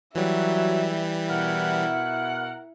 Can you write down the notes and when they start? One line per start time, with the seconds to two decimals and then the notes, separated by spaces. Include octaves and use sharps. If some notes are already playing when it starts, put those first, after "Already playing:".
0.15 E3 F#3 G3 E5
1.30 B2 E4 A#4 F#5